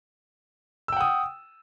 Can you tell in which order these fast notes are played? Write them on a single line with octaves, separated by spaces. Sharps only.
E6 G5 F#5 D#6